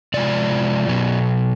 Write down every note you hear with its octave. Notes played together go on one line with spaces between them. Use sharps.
C3 F3 G#3 D5
B2 F#3 B3